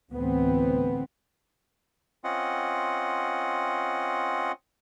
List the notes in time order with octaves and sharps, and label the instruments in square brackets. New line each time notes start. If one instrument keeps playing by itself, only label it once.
[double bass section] D2 A2 E3 B3 C4
[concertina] C4 C#4 F4 D#5 F#5